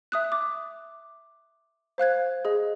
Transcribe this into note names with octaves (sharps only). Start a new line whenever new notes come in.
E5 D#6 F#6
D6
C5 F5 F#6 G#6
G#4 D#5